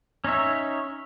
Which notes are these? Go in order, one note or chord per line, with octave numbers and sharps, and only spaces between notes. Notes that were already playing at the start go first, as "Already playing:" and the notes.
C#4 D#4 C#5 E5